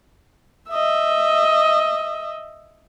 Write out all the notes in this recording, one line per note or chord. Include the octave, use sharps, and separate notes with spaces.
D#5 E5